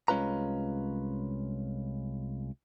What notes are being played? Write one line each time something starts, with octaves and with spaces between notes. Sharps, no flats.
C2 G#3 C#4 F4 B4 A#5